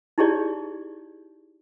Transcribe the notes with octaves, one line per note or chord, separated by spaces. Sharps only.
D#4 E4 G4 G#4 C#5 D5